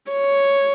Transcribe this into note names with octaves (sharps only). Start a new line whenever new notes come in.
C#5